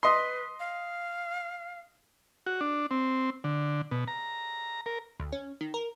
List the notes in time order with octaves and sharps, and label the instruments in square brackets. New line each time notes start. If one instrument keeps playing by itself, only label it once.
[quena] B4 [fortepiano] D#5 C6
[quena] F5
[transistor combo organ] F#4
D4
C4
D3
B2
A#5
A#4
[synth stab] D2
C#4
D#3
A#4